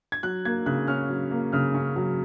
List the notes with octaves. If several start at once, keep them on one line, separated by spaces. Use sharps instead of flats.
G#6
F#3 F#6
A#3 G#6
C#3 F#6
C#4 F6
F#3
A#3
C#3 F6
C#4
F#3